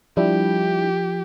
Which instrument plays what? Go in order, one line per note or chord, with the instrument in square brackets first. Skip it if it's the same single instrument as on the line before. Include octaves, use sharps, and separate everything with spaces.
[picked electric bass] F3 [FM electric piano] G3 D4 E4 [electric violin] G4